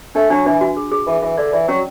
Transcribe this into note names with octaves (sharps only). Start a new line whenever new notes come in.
A3 D4
F#3 D4
E3 D4
F#4
G#4
G#4
E3 A5
E3 E5
D3 D5
E3 D5
F#3 C#4